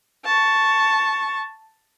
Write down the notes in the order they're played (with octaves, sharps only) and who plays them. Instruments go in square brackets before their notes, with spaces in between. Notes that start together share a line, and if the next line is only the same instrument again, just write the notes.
[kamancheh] A5 C#6